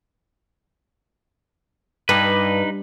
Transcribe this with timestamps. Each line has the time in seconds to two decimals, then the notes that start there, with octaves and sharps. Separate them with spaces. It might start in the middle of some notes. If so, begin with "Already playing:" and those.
2.09 G2 D#4 B4